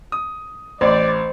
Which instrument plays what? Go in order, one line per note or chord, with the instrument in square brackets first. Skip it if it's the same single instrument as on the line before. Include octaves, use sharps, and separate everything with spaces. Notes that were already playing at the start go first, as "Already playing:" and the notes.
[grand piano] D#6
[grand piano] A1 [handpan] C5 [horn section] D5